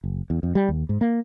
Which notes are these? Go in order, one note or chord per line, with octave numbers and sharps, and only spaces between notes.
F#1
E2
F2
G3
D#2
G#2
A#3